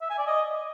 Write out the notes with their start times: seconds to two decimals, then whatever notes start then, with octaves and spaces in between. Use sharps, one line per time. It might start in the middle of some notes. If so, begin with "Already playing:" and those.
0.01 E5
0.10 G#5
0.18 D5
0.27 D#5